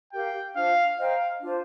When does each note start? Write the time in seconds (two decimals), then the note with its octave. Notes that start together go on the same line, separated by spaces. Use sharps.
0.13 G4 A#4 F5 G5
0.55 D4 F4 C5 F5
0.98 C5 D#5 F5 G5 A#5
1.41 D4 F4 C5